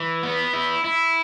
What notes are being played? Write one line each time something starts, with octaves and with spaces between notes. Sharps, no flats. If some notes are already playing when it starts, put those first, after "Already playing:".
Already playing: E3
B3
E4
E4